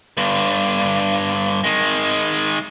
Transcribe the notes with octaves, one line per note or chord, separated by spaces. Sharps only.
G2 D3
D#3 G#3